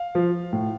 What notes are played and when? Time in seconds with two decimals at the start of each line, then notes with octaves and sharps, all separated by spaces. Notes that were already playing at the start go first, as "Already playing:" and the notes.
Already playing: F5
0.15 F3
0.53 A2